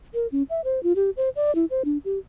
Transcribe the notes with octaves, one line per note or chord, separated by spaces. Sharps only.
A#4
C#4
E5
C5
F4
G4
C5
D5
E4
C5
D4
G4